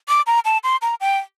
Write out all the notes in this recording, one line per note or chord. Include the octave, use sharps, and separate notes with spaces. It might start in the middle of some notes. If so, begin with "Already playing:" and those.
D6
A#5
A5
C6
A#5
G5